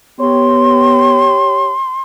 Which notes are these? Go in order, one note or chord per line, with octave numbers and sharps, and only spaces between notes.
B3 G4 C#5 C6